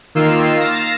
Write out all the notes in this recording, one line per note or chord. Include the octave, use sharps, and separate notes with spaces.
D#3 A#3 F4 E6 C7
F5 A6 A#6 E7